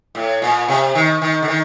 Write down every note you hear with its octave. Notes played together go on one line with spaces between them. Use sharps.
A2
A#2
C3
D#3
D#3
D3
D#3